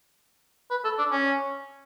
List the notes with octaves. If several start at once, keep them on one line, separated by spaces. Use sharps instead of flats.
B4
A4
D4
C#4